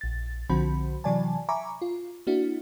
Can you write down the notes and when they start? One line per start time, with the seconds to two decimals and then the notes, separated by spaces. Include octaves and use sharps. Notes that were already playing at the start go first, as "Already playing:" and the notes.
0.01 A#1 A6
0.49 B1 D3 F3 C4 F#4 B5
1.04 C3 E3 F#3 D5 G#5 A5
1.49 E5 G#5 A#5 B5 C#6 D6
1.82 F4
2.27 A#3 D4 E4 F#4